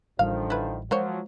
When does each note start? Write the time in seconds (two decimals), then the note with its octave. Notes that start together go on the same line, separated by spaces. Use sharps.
0.19 A1 D3 D#3 F3 G3 F5
0.50 E4 B4
0.91 F3 F#3 G#3 A#3 C5 C#5